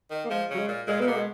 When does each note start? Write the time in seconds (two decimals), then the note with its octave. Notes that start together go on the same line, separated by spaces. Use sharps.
0.11 D#3
0.24 A#3
0.30 F3 G#3
0.50 C#3 F#3
0.59 G#3
0.68 A#2
0.88 A#2 G#3
1.00 A#2 B3
1.07 B2 A#3
1.17 G#3